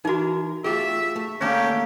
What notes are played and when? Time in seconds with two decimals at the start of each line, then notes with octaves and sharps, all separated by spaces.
0.05 E3 D#4 F#4 A#4
0.64 A3 F4 G4 G#4 E5
1.16 A3
1.41 D3 D#3 A3 A#3 C#4 G4 C#5